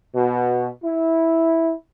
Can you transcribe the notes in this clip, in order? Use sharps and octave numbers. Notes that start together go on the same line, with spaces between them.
B2
E4